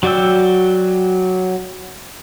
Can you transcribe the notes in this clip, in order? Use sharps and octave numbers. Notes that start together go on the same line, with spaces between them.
F#3 F#4 D5 G5 E6